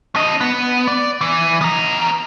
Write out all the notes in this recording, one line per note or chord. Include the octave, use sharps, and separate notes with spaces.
D4 D#5
B3
D5
E3
B3 A#5